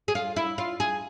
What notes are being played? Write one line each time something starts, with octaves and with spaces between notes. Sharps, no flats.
G#4
F4
E4
F4
G#4